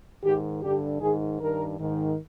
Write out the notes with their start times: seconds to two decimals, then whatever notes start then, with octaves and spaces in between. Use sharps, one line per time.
0.24 G#2 D#3 G4
0.62 G2 D3 G4
1.01 G#2 D#3 G#4
1.39 G2 D#3 A#4
1.79 G#2 D#3